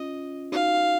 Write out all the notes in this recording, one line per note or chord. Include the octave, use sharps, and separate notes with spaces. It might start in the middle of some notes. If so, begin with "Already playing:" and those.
Already playing: C#4 F4 D#5
D#4 F#4 F5